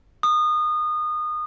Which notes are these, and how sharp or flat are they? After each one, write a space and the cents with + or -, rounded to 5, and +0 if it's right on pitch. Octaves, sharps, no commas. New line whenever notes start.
D#6 -25